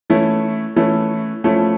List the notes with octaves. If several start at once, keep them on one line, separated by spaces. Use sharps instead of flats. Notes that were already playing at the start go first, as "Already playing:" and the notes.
E3 A3 C#4 E4
E3 A3 C#4 E4
F3 A3 C#4 E4